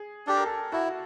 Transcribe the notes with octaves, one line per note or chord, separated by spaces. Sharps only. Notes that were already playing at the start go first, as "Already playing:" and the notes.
Already playing: G#4
D4 G4 A4
A#4
A4
E4 F#4